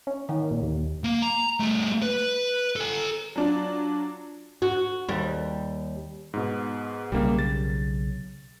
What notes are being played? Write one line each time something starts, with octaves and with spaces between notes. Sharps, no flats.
C#4
D#3
A#2
D#2
A#3
A#5
G3 A3
B4
A4 G#5
F#3 D4 F4
F#4
D#2 G3
G#2 B2
B1 C#3 G3 A#3
A6